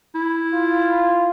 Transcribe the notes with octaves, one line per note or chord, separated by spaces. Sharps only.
E4
F4